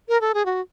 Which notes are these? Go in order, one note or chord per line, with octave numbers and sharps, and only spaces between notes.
A#4
A4
G#4
F#4